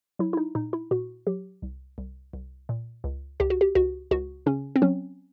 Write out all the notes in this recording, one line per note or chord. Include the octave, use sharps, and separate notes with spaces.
F#3 E4
E4
D#4
A#2 D#4
E4
A#2 F#4
F#3 G4
C2
C2
C2
A#2
C#2
C#2 G4
F#4
G4
C#2 F#4
C#2 F#4
C#3 C#4
C4
F#3 C#4